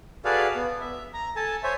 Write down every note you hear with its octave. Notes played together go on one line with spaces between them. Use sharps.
F#4 G#4 A4 B4 D5 F5
B3
E5
A#5
A4 G#5 A5
C5 C#5 E5 G#5